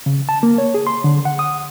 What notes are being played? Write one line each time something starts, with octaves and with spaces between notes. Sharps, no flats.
C#3
A5
A#3
C#5
G#4
C6
D3
F#5
D#6